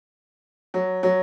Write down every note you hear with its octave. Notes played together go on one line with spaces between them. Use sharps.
F#3
F#3